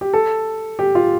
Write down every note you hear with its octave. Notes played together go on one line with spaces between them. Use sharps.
G4
A4
G4
F4